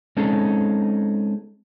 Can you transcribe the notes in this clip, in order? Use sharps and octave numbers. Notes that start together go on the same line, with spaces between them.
G#3 C4 C#4 D#4 G#4 A4